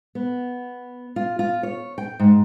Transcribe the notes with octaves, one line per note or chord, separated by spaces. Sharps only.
B3
F4
F4
C#5
G5
G#2